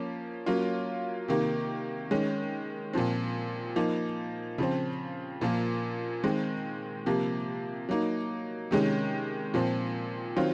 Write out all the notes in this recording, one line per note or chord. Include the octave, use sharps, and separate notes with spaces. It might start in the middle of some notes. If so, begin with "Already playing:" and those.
Already playing: F3 A#3 C#4
F#3 A#3 C#4 F4
C3 D#3 A#3
D#3 G#3 C#4
A#2 F3 C4
F3 A#3 D#4
C#3 F3 C4
A#2 F3 A#3
D#3 G#3 C4
C3 F3 A#3
F#3 A#3 D#4
C3 D#3 G#3 C#4
A#2 F3 C4
D#3 F#3 C4 F4